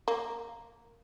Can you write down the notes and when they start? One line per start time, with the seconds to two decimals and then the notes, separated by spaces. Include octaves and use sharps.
0.08 A#3